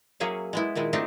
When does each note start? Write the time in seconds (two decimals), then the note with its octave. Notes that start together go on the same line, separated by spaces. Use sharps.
0.20 F#3 A#3 C#4 G#4 E5 F5
0.53 G#3 B3 E4
0.75 A#2 D#3 G#3 E4
0.93 A3 C4 D4 D#4 F4